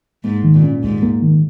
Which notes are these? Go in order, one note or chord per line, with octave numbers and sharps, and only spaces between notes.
G#2 A#3
D#3
A#2
C#4
D#2 G#2
A#3
D#3